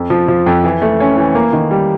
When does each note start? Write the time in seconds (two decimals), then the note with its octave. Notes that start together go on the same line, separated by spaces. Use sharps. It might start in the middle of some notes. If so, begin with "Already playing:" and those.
Already playing: F2
0.10 F3
0.28 F3
0.46 F2
0.64 E3
0.82 A3
1.00 C#4
1.17 E3
1.35 A#3
1.53 D#3
1.71 G3